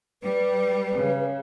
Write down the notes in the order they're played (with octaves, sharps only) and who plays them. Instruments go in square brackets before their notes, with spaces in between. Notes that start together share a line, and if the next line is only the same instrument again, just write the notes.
[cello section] G3 [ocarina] B4
[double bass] C#3